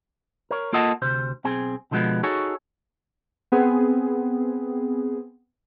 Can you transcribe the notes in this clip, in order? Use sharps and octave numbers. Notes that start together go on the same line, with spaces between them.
A#4 C#5
A#3 F4 A4 D#5 F#5 A5
D2 C3 C5
B1 C4 G#4
B2 D3 F3 G#3 B3
D#4 F#4 G#4 A4 C#5
B3 C4 G#4